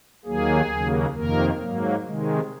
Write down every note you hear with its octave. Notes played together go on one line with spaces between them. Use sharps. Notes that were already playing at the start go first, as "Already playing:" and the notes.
D#2 D#3 F#3 A#3 G#4
D#2 C#3 F#3 A#3
F2 C3 D#3 A#3 A#4
G#2 F#3 A#3
C3 D#3 G#3